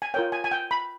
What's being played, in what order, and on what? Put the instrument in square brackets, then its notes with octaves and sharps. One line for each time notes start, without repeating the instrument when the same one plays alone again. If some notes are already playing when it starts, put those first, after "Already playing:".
[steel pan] G#5
F4 A#4 C#5 G5
G#5
G#5
G5
B5